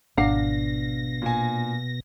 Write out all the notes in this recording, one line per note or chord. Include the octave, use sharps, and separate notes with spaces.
G#1 B2 D4 F5 F#5 A#5 A#6 C7
A#2 G#5